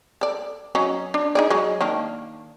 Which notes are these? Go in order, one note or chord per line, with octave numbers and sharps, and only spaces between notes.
A4 D5
F#3 C#4 D#4
D4
D#4 G#4 D5
F#3 G#3
D#3 A#3 D4